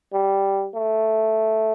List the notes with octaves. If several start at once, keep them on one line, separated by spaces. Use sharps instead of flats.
G3
A3